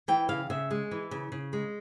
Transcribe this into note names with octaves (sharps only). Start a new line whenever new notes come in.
E3 G5
C#3 F5
C#3 E5
G#3
E3
C#3
C#3
G#3